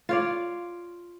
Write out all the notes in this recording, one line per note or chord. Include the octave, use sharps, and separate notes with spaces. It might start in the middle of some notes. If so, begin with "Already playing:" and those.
F4 C#5 D5